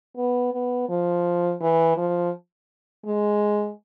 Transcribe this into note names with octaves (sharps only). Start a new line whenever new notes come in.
B3
B3
F3
E3
F3
G#3